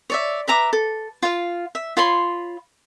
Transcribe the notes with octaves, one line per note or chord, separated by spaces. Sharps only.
C#5 D5 E5
B4 E5 A#5 D6
A4
F4 F5
E5
F4 C#5 B5 C6